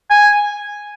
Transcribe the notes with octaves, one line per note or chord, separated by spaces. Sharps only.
G#5